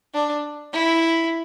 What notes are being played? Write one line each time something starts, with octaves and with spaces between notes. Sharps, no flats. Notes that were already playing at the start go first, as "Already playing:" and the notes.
D4
E4